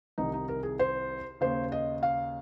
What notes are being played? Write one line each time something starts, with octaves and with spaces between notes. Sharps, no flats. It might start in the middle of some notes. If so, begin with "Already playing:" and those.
C2 C3 D#3 D#4
D#4
A#4
G#4
C5
D#2 C#3 C5
D#5
F5